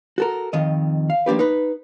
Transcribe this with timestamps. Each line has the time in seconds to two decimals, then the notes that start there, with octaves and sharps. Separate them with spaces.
0.18 F#4 A4 A#4
0.53 F2 D#3 D#5
1.10 F5
1.26 F3 A#3 D4 G4 B4
1.39 D#4 B4